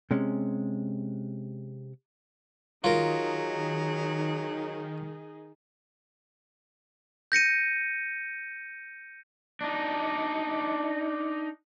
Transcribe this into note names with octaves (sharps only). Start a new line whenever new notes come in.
C3 G#3 C#4
D#3 F#3 D#4 F4 G#4 A#4
G6 A#6 C#7 D#7
D4 D#4